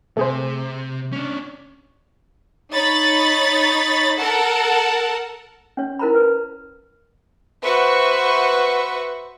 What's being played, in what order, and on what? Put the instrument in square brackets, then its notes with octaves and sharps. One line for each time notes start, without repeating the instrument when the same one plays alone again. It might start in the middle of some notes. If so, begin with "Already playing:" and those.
[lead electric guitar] C3 [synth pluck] A3 G#4 C5
[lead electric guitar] C#4 D4
[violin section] D#4 C#5 B5 A6
A4 A#4 F#5 A5
[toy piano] C#4 C#5
E4 A#4 C5 A#5 B5
B4
[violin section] F#4 B4 C5 E5 C#6